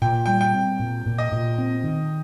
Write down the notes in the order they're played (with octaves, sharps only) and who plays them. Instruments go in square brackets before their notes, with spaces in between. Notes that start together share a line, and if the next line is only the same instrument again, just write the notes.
[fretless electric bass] A#2 [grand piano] G5
[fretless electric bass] G3 [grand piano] G5
[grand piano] G5
[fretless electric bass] C4
A#2
A#2
[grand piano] D#5
[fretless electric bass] A#2
C4
D#3